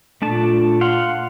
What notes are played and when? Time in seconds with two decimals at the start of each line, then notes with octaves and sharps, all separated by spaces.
0.22 A#2 A3 D4 A5
0.81 F5 F#5 C6